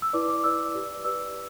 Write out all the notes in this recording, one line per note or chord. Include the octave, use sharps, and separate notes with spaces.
E6
E4 B4 D5 D6
D6
E4 B4 D5 E6
G4 B4 D5
G4 B4 D5 E6